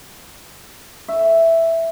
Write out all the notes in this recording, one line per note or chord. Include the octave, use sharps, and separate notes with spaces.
E5